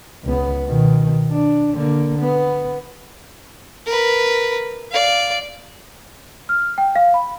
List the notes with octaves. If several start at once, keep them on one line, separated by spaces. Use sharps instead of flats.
C#2 B3
B2 D#3
D4
D3 A#3
B3
A#4 B4
D5 F5
F6
G5
F5
B5